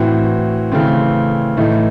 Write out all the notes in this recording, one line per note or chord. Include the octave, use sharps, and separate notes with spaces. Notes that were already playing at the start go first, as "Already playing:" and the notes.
Already playing: A2 E3 C4 F#4
C#3 E3 A3 C4
A2 E3 A3 D#4